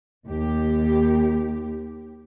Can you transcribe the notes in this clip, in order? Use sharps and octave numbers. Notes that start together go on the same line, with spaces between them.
D#2 G4